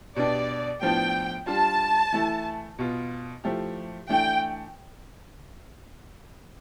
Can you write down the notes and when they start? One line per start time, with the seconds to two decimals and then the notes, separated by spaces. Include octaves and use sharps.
0.16 B2 B3 D4 G4 D5
0.82 A2 F3 B3 D4 G5
1.47 G3 D4 F4 A5
2.13 E3 A3 E4
2.79 B2 B3 F4
3.44 F3 A3 E4 G4
4.09 E3 A3 D4 G5